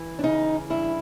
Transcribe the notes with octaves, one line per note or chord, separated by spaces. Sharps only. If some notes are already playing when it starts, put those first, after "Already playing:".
Already playing: E3
D4
C#3 D#4
G2 E4